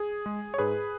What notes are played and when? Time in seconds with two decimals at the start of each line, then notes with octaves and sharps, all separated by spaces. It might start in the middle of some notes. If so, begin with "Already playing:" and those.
Already playing: G#4
0.26 G#3
0.54 C#5
0.58 G#2 G#4 B4